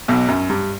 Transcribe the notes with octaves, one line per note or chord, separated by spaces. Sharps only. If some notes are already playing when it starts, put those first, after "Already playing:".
B1 B2
F#2
G2